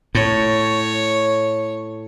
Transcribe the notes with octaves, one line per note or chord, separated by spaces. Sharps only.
A2 C#5